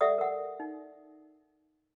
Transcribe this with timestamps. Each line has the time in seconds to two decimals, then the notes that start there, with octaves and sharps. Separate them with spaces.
0.01 G4 A4 D5 E5 F#5 D#6
0.18 A#4 F#5
0.60 D#4